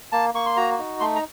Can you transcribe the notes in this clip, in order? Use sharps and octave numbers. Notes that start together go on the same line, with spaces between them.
A#3 A5
A#3 C#6
C6
F#4 A#5
D#4
A3 C6
A#5